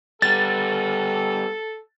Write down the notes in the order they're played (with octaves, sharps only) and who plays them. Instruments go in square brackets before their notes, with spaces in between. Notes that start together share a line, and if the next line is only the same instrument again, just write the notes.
[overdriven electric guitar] G3 B3 [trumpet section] A4 [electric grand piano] A6